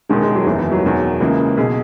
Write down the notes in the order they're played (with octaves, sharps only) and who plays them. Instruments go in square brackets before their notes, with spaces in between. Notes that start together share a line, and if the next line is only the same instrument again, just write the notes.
[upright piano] E1 E2 D#3 G#3
G#3
F#3
F#1 E2 D#3 E3
E3
F#3
E1 E2 D#3
C#2 C#3 E3 A#3
B1 B2 G#4